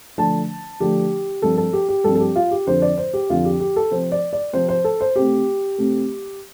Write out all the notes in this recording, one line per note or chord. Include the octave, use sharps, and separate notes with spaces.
D3 F3 A3 D4 A5
D3 F3 A3 D4 G4
G2 F3 C4 A4
A4
G4
G4
G2 F3 C4 A4
A4
G4
F4
G4
F2 D3 F3 D4 C5
D5
C5
G4
F2 D3 F3 D4 F4
G4
G4
A4
C3 F3 C4 C5
D5
D5
C3 F3 C4 C5
C5
A4
C5
C3 A3 C4 G4
C3 A3 C4